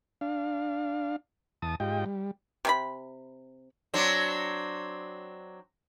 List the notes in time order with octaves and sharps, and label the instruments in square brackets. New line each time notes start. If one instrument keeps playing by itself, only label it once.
[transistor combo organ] D4 F5
E2 A5 D#6
G#2 F4 G4 D#5 G5
G3
[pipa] C3 C#4 B5
[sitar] F#3 C4 D4